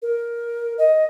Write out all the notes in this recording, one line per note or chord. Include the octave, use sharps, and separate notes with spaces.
A#4
D#5